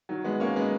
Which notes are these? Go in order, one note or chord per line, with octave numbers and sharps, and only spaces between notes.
D#3 F#3
G#3 B3
A#3 C#4
G#3 B3